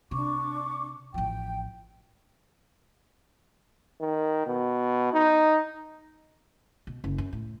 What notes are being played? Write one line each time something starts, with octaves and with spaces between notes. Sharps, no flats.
C3 D4 C#6 D6
A1 F3 G5
D#3
B2
D#4
B2
F#1
F#2
A2